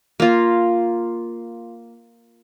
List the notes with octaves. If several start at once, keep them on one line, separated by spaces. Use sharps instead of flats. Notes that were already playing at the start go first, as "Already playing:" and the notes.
A#3 F4